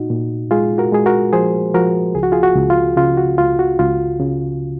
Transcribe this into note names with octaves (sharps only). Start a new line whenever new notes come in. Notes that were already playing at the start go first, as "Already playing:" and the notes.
Already playing: A#2 D#4 F#4
A#2
G#3 F4 G#4
F#4 A#4
G#3 G#4
F#4 A#4
F3 G#4 C5
F3 F#4 A#4
C#2 G#4
F#4
F4 G#4
F#4
C#2
F4
C#3 F4
F#4
C#2 F4
F#4
C#2 F4
C#3